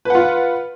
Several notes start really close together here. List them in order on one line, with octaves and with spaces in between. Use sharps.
B4 F#5 F4